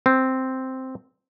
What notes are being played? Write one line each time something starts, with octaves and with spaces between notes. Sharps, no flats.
C4